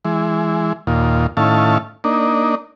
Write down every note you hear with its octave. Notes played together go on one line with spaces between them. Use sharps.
E3 G#3
D#2 A#2 F4
A2 D#3 C#4 E4 F5 A5
A#3 D4 D#4